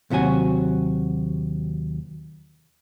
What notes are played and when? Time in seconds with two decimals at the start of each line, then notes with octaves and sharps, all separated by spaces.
0.10 D#2 C3 F#3 F#4 G#5